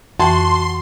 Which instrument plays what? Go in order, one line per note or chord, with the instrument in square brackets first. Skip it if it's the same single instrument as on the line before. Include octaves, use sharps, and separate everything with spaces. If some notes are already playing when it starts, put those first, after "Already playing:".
[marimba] F2 E3 G5 [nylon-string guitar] F#4 [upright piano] A5 [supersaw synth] C6